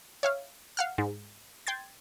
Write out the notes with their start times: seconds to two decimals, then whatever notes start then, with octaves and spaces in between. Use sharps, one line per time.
0.23 C#5 E5 F5
0.77 F5 F#5 F6
0.98 G#2
1.67 G5 C6 G#6 A6